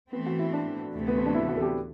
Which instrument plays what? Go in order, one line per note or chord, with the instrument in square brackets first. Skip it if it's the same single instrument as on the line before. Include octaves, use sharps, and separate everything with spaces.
[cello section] E3 A3 C4 [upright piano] B3
[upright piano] F#4
E4
D4
[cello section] D2 C3 E3 A3
[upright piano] B3
C4
D4
E4
F#4
A4
G4